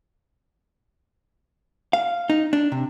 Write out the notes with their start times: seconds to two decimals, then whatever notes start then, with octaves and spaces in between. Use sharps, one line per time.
1.93 F5
2.30 D#4
2.53 D4
2.72 C3